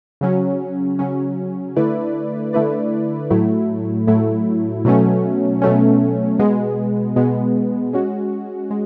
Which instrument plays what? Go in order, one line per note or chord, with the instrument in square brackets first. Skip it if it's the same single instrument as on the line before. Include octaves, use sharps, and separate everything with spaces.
[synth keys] C#3 F#3 C#4
C#3 F#3 C#4
D3 A3 E4 B4 D5
D3 A3 E4 B4 D5
A2 F#3 A3 E4
A2 F#3 A3 E4
B2 F#3 A3 C#4
B2 F#3 A3 C#4
B2 G#3 B3
B2 G#3 B3
G#3 C#4 F#4
G#3